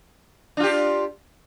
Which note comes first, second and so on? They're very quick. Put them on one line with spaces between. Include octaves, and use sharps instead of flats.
D4 F4 G4